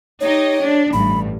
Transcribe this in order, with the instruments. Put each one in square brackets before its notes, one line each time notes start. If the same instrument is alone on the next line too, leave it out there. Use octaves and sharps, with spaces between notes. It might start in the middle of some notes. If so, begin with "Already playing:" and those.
[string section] D#4 G4 D#5 [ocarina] C#5
[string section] D4
[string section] A1 G2 [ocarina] B5